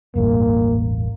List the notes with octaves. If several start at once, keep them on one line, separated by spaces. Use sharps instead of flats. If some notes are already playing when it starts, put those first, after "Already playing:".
E1 A1 G2 A#3